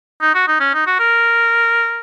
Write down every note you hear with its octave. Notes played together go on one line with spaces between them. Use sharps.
D#4
F#4
D#4
C#4
D#4
F#4
A#4